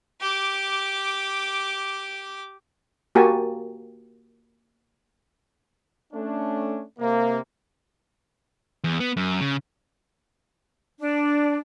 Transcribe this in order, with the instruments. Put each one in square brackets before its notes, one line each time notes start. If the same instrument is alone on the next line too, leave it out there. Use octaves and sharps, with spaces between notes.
[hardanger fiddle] G4 D6
[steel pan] A#3 F#4 G4 A#4 G#5 A5
[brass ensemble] A3 C#4 D4
C3 A#3
[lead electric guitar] E2
B3
F#2
C#3
[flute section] D4